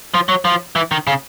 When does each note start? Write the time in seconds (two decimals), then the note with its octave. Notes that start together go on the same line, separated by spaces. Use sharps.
0.14 F3
0.29 F#3
0.45 F3
0.76 E3
0.91 D#3
1.07 C#3